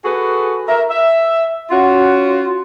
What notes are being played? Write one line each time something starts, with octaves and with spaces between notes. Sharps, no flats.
F#4 G#4 A4 B4
A#4 E5
E5
C#4 F4 F#4